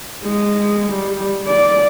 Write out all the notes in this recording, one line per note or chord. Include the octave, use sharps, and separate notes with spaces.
G#3
G3
D5